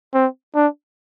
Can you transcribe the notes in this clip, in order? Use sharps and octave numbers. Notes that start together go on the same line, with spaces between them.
C4
D4